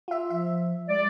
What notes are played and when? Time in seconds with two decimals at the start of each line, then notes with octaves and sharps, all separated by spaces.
0.08 F4 E5
0.30 F3 E5
0.88 G#3 D5